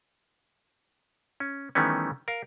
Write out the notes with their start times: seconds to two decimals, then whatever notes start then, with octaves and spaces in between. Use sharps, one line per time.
1.40 C#4
1.75 D#3 E3 G3 A3 B3 C#4
2.28 A#4 F5